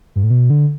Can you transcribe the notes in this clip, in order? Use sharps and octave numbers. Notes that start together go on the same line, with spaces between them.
G2
A2
B2
D3